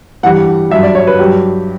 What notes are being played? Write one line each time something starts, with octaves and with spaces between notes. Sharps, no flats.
G2 E3 G3 F#5
G2 F#3 E5
D5
C#5
B4
G2 F#3 G4